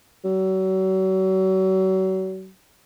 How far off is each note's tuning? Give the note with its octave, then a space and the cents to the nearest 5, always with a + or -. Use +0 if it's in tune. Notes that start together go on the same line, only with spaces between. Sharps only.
F#3 +35